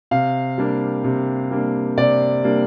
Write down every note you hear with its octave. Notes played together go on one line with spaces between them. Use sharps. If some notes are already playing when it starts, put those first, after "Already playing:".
C3 F5
G3 A#3 D4
C3
G3 A#3 D4
C3 D5
G3 A#3 D4